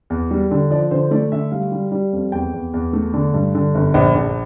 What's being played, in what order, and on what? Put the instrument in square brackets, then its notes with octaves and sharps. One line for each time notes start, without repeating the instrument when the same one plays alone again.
[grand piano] E2
G3
D3
F3 D5
D3 C5
A3 D5
D3 E5
G3 F5
G3
G3
F2
E2 G5
E2
E2
A3
D3
G2
D3
G1
A#1
A#1